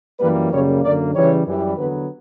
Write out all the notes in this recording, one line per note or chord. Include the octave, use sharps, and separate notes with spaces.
F#2 E3 G3 A#3 B4
F#2 C#3 G3 A#3 C#5
F#2 D3 A#3 D5
C#3 E3 G3 C#5
F#2 E3 G3
E2 D3 F#3 B3 B4